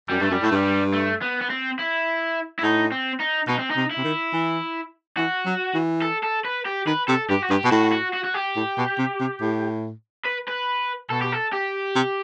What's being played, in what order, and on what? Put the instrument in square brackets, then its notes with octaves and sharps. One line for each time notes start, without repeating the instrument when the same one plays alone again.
[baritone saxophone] F#2 [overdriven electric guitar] G3
[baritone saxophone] G2 [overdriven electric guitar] A3
[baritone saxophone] F#2 [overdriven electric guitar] G3
[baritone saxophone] A2 [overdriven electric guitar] A3
[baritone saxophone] G2 [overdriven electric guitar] G3
[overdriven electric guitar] A3
B3
B3
C4
E4
E4
[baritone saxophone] A2 [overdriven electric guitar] D#4
[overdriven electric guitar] C4
D#4
[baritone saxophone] B2 [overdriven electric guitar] D#4
[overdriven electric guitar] C4
D#4
[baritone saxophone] C3
[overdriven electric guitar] E4
[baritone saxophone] C3
D#3
E3
[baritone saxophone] E3 [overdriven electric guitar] F#4
[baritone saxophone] F#3
E3
[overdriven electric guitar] A4
A4
B4
G4
[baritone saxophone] D#3 [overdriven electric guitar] B4
[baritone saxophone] C3 [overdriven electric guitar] A4
[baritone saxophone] G2 [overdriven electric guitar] G4
[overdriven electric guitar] F#4
[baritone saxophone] G2 [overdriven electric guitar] G4
[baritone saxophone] B2
[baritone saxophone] A2 [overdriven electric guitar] F#4
[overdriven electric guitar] F#4
F#4
F#4
G4
[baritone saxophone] A2
B2
C3
C3
A2
[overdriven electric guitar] B4
B4
[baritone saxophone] B2 [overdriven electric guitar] A4
[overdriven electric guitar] G4
A4
G4
[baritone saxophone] C3